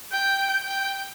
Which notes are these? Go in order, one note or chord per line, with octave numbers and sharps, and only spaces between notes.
G5
G5